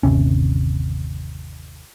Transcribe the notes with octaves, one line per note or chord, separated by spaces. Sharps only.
G1 D#2 C3 C#4